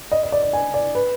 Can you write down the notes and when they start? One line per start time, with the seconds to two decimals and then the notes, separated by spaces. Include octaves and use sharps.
0.12 D#5
0.23 D#5
0.32 D5
0.43 D5
0.53 G#5
0.74 D5
0.95 B4